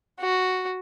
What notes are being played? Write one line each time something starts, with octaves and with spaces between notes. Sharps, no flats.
F#4